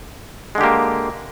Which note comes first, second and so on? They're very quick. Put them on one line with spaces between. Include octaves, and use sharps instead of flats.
G#3 D3 G4 A#3